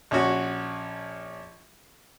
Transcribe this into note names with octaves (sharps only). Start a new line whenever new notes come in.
A#1 C#4 F#4